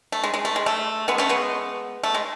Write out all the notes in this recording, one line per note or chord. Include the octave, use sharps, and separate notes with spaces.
A3
G#3
G#3
A3
G#3
A3
G#3 B3
A3 C#4
G#3 B3
A3
G#3